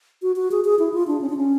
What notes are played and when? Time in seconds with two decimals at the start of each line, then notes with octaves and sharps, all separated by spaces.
0.22 F#4
0.36 F#4
0.51 G#4
0.65 G#4
0.79 E4
0.94 F4
1.07 D4
1.21 C#4
1.30 D4
1.37 C#4